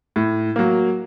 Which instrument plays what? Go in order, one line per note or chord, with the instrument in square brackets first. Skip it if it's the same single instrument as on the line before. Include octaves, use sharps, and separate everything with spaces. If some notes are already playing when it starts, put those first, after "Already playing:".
[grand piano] A2
F#3 A#3